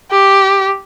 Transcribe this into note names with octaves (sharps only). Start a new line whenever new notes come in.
G4